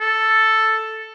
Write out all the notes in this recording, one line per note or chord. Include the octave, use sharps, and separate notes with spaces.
A4